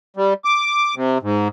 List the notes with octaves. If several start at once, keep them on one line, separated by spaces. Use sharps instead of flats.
G3
D6
C3
G#2